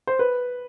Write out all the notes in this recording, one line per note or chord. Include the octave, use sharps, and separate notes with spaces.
C5
B4